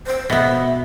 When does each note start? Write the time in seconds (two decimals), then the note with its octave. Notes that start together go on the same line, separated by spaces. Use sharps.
0.07 C5
0.30 B2 B3 E5